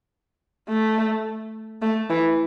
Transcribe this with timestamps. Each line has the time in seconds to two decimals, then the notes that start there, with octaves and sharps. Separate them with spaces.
0.69 A3
1.82 A3
2.10 E3